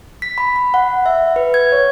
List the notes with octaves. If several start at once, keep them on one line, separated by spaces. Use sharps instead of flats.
B6
B5
B5
F#5
E5
B4
G#6
C#5